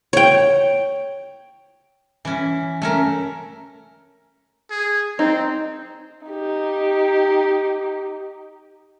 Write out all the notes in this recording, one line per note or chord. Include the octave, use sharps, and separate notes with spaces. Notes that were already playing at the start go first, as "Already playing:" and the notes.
C#5 G5
E3 C#4
A3 C#4 A#4
G#4
C4 D#4
D#4 G4